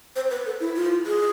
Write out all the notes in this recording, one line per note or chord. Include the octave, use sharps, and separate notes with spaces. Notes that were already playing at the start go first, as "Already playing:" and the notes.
C5
B4
A4
E4
F4
G#4